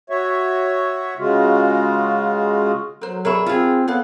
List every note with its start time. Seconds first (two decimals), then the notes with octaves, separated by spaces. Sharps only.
0.10 F#4 C#5 E5
1.18 C#3 G#3 F4 F#4
3.02 F#3 A#4 C5
3.25 G#4 A#4 C#5 E5 B5
3.46 C4 F4 G#4
3.88 B3 A4 C#5 F5